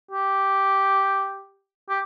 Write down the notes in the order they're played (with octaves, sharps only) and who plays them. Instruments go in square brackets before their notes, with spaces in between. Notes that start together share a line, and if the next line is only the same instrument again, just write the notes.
[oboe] G4
G4